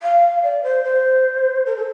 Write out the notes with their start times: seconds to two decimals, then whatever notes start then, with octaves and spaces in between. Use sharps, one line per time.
0.02 F5
0.43 D5
0.63 C5
0.84 C5
1.66 A#4
1.76 A4